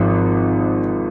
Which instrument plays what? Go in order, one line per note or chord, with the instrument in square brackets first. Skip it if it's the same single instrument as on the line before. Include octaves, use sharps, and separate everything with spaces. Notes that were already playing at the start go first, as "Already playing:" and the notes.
Already playing: [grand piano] G#1 G#2 F3